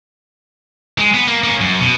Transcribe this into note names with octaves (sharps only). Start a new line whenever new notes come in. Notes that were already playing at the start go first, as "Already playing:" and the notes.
G#3
B3
A#3
A#3 C#4
F#2
B2